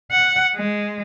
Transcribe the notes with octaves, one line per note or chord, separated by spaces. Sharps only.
F#5
G#3